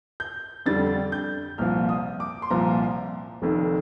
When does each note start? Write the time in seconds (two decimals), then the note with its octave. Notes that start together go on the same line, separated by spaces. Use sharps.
0.20 G6
0.66 F2 D3 G3 A6
1.12 G6
1.58 C2 A#2 F3 F6
1.89 D#6
2.20 D6
2.42 C6
2.50 C2 A#2 F3 A#5
3.42 F1 F2 D#3